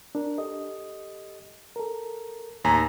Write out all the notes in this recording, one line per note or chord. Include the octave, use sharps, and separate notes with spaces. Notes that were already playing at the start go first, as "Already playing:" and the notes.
D4 A#4
G4 A4 D#5
A4 A#4
D#2 A2 G#5 A#5